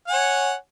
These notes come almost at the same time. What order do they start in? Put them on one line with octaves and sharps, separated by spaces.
F#5 G#5 C#5